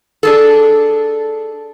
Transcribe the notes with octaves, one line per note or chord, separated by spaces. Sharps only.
D4 G#4 A4